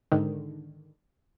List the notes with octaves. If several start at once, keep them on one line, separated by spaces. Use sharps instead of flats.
G#2 D3 D#3